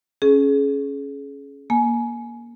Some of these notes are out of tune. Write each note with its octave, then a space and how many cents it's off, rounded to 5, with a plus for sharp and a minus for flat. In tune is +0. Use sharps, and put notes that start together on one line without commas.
C#4 +0 G#4 +30
A#3 +20 G#5 +25